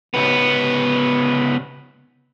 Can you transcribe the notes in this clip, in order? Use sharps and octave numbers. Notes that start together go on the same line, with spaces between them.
C#2 B3